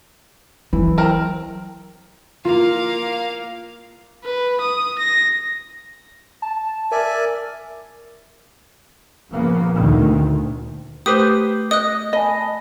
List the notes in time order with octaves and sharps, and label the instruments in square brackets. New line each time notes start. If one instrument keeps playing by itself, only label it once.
[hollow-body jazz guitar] E3 [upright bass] F#3
[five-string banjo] C4 A#4
[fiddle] A#3 F5 [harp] F4
[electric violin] B4
D#6
A#6
[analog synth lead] A5
[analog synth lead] A#4 [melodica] D5 E5 G#5
[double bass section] A#2 C#3 F3 A#3 B3
D2 A#2 D3 D#3
[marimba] A3 D6 G6 [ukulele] G4 B4 C5 [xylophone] D#6
[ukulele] D#5 [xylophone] D#6 F#6
[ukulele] D#5 [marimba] G#5 A5 B5